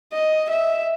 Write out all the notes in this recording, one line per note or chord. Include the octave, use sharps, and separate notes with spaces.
D#5
E5